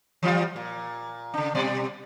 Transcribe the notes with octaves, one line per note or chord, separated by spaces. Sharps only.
E3 G3 F4
A#2
C#3 D4
B2 G3 D5